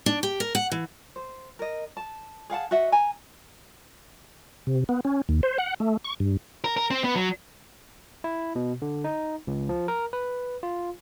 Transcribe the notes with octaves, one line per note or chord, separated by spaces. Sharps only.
D4
G4
A#4
F#5
E3
C5
A#4 D#5
A5
G#4 F5 F#5 A5
F#4 D#5 E5 F#5
G#5 A#5
C3
B3
C#4
D#2
C5
F#5
A3
C#6
G2
A#4
A#4
C4
B3
F#3
E4
B2
D3
D#4
C#2
F3
A#4
B4
F4